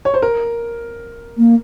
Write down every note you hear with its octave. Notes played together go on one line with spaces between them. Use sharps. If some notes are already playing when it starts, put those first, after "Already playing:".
C#5
C5
A#4
A#3